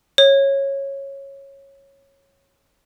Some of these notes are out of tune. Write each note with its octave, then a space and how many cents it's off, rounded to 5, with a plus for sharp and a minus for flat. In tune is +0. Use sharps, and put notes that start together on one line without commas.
C#5 -15